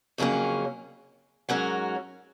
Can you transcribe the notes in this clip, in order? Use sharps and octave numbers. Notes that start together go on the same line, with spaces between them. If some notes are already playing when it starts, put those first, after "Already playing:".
F2 C#3 F#3 A#3 C#4
G#2 F#3 C#4 F#4 A#4